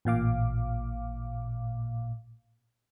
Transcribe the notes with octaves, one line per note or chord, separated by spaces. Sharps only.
A1 A#2 F5 D6